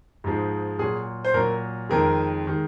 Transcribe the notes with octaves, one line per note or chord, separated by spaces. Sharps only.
G#2 F3 G#3
A#2 F#3 G#4
C5
A#2 F#3 A#4
F2 D#3 G#3 A#4
D#3 G#3